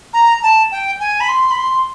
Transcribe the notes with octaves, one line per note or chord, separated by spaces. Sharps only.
A#5
A5
G5
G#5
B5
C6
B5
C6